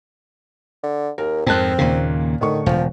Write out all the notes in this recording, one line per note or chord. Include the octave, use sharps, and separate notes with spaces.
D3
D#2 A#4
F2 G#2 C4 A#4 A5 F#6
D#2 A#2 C#3 A#3
A2 D3 D#3 C#6
E1 F3